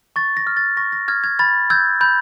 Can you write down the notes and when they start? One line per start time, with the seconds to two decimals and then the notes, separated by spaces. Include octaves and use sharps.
0.16 C#6 A6
0.37 A#6
0.47 F6
0.57 A6
0.77 C#6 A#6
0.92 A#6
1.08 F6 G#6
1.24 G#6
1.39 B5 A6
1.70 E6 G6 G#6
2.01 B5 G6